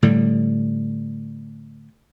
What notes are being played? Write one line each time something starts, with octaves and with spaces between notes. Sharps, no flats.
A2 D3 G3